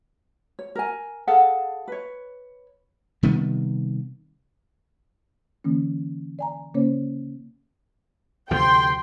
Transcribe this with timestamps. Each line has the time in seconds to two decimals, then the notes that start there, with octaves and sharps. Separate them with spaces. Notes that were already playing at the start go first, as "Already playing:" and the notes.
0.59 C#5
0.75 A#4 G#5
1.27 G#4 A4 F5 F#5
1.88 B4 C#5
3.23 C3 D#3 G3 B3
5.64 D3 E3 A#3 C#4
6.39 D5 G#5 A#5
6.74 C#3 A#3 C#4 C5 C#5
8.51 D2 C3 F3 G5 C6